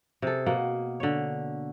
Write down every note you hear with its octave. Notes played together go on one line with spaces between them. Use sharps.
C3 G#4 A4
B2 A#3 F#5
D3 C#5